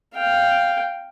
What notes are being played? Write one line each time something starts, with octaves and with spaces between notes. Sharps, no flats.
F5 G5